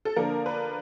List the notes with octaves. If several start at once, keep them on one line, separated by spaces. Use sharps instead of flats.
A4
D3 F3 A#3 D4 A#4
B4